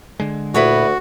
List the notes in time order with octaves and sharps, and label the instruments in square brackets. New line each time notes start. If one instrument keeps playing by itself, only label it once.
[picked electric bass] D3 G#3
[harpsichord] D2 [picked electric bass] A#2 [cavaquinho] E4 B4 C#5 [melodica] F#4